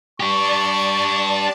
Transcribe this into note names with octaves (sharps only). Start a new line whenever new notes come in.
D4 G4 D5 A5 C#6